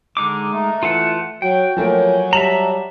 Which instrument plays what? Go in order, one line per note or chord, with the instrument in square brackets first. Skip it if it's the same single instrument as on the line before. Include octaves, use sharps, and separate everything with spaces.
[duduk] D3 [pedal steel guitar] G#3 D#4 D6
[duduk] A3 [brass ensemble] A#5
[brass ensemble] E3 [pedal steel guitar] F4 A4 F#5
[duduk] F#3 [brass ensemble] F#4 [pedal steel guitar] G5
[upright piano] F3 A3 A#3 [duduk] F#3 [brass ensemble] C#5 G#5
[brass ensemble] G3 [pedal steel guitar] E5 A5 A#5 [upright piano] F#7